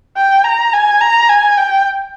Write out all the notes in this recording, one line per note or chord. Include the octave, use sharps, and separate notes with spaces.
G5
A#5
G#5
A#5
G#5
G5